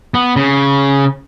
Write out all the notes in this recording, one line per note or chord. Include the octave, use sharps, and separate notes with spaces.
B3
C#3